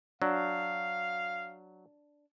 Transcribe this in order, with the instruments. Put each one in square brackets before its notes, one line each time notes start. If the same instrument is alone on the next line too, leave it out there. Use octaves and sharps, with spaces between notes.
[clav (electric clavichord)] F#3 [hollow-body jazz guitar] D4 [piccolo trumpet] F5